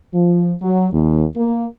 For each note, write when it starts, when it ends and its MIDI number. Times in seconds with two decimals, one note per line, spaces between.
0.13 0.53 53
0.61 0.88 54
0.92 1.24 39
1.36 1.65 58